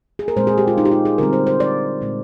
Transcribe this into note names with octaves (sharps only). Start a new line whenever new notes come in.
G#4
A#4
A#2 G#3 C4 C5
G#4
G4
F4
D#4
G4
F4
G#4
D3 G3 C4 A#4
C5
C5
D5
A#2 G#3 C4